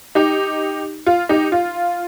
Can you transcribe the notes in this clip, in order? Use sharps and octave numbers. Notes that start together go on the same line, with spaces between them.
D#4 G4
F4
D#4 G4
F4